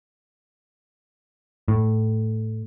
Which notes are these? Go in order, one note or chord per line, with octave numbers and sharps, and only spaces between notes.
A2